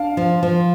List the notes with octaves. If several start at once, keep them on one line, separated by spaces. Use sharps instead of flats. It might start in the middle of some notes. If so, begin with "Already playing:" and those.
Already playing: D4 F5
F3
F3